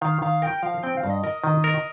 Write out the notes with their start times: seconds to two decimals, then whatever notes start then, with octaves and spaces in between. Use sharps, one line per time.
0.01 D#3 F5
0.22 D#3 F5
0.42 A#4 G5
0.63 F3 F5
0.83 C4 G5
0.97 F5
1.04 G2
1.10 D#5
1.24 A#4 D#5
1.44 D#3
1.64 A#4